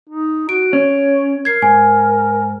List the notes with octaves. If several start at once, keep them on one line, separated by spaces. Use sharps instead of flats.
D#4
F#4 D7
C#4 C#5
A#4 G#6 C7
G#2 G#5